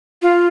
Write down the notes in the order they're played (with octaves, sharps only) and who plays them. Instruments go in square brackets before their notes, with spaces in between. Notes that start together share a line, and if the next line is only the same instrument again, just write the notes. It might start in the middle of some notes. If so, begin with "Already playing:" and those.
[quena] F4